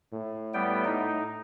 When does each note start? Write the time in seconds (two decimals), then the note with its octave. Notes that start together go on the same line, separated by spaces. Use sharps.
0.13 A2
0.54 G3 B3 G5
0.85 D#4